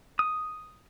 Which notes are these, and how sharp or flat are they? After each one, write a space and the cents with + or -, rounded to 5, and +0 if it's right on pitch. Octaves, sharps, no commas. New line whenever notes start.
D#6 +0